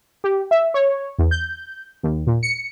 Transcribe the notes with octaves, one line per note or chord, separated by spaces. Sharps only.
G4
E5
C#5
E2
G6
D#2
A#2
C#7